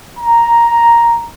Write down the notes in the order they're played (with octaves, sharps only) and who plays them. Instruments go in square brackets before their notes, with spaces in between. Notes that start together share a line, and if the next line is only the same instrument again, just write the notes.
[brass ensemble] A#5